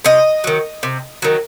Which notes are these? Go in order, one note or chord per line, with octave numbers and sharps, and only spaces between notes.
C3 D#5
D#3 F#3
C3
D#3 F#3